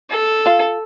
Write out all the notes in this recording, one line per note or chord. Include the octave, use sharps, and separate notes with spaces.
A4
F4 F5